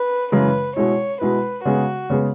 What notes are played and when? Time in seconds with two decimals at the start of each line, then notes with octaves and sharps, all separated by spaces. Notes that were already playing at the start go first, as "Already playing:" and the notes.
Already playing: B4
0.32 F#2 C#3 E3 G#3 E4 B4
0.77 B2 G#3 E4 C#5
1.21 B2 G#3 E4 B4
1.65 C#3 G#3 B3 F#4 G#4
2.10 C#3 G#3 B3 G#4